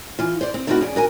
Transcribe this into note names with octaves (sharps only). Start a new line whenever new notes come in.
E3 F4
C5 D5
C4
A3 A#3 C4 D#4 E4 F#4
F2 C#3 G#4 D5
D#2 F#4 A#4 G#5